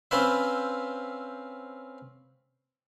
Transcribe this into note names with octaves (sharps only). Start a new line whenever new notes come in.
C4 C#4 F4 B4 C5 E5